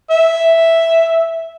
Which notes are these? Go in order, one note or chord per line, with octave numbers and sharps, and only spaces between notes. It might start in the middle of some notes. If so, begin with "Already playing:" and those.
E5